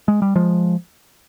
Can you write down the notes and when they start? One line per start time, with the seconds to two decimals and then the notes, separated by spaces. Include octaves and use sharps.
0.08 G#3
0.22 G3
0.36 F3 G#3